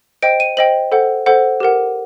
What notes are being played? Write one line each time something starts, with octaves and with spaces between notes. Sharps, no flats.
C5 D#5 G5 D7
D#7
C5 D#5 G5 F#7
A4 C5 F#5
A4 C5 F#5
G4 A#4 F#5